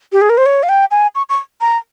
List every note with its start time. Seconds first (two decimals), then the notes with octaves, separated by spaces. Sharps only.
0.12 G4
0.21 G#4
0.30 A#4
0.38 C5
0.46 C#5
0.63 F5
0.69 G5
0.91 G#5
1.15 C#6
1.29 C#6
1.61 A#5